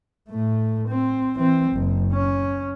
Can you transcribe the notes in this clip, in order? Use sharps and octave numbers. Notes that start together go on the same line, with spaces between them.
A2 A3
C4
E3 C4
F#1
C#4